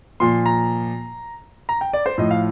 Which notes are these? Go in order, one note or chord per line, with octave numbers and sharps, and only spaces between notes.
A#2 F3 C6
A#5
A#5
G5
D5
C5
A2 F3 D#5
F5